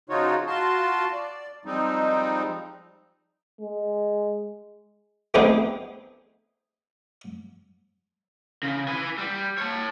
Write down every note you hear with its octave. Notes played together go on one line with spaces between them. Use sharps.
C#3 F3 D#4 F4 F#4 C#5
F4 F#4 A5 C6
D5
F3 G3 G#3 C4 D#4
G#3
A3 B3 C4 D4 D#4 G#4
C#3
B4 G#5
G3
C#5 A5